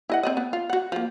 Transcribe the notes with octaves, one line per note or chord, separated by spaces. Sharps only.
E4 D#5 F#5
C4 D5 D#5
B3
F4
F#4 F#5
F3 A#3